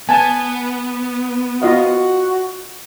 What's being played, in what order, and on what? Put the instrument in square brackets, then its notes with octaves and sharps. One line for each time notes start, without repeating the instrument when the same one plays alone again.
[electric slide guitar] B3 [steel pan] G#5 A5
[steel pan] F4 D#5 F5 [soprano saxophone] F#4